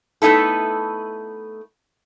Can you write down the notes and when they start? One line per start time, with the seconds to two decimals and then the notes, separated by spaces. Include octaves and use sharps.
0.22 A3 B3 D#4 E4 A4